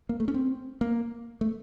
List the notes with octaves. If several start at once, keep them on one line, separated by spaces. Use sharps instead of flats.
A#3
A3
C#4
C4
A#3
A3